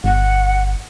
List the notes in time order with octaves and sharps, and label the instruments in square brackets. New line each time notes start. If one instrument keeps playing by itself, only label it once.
[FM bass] G1 [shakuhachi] F#5